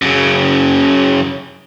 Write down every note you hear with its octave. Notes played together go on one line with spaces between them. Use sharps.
F#2 C#3